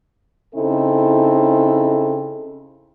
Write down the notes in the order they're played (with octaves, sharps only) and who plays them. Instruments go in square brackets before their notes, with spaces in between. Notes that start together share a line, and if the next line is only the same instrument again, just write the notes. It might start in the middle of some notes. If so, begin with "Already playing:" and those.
[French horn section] C#3 C4 D#4 E4 A4